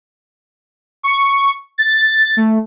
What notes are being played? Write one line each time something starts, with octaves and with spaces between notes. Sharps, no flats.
C#6
A6
A3